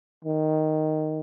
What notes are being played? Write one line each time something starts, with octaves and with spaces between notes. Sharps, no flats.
D#3